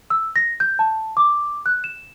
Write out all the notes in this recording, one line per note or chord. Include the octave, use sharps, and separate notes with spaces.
E6
A#6
G6
A5
D6
F#6
E7